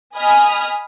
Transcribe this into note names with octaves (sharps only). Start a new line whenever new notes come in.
D#5 G#5 B5 D#6 F6